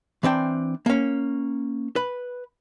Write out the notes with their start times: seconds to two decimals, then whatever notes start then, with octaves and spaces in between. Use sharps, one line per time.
0.23 E3 C4 D4 G5
0.86 A#3 C#4
1.96 B4